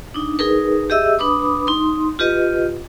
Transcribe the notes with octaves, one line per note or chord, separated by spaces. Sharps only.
D4 D#4
D#4 G#4 A#4 B4
G4 G#4 D#5 E5 E6
D4 B4 B5 D6 D#6
D#4 C6
F4 G4 B4 D#5